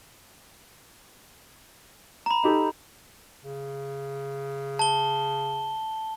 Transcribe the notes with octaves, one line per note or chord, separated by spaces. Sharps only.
A#5 B5
D#4 G4 A4
C#3
A5 G7